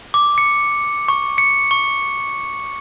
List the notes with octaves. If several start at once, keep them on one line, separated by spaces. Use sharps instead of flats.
D6
C#7
C#6
C#7
C#6